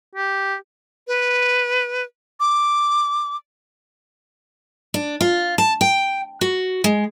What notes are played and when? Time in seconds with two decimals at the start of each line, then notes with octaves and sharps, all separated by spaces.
0.15 G4
1.08 B4
2.40 D6
4.94 D4
5.21 F4
5.58 A5
5.81 G5
6.41 F#4
6.84 G#3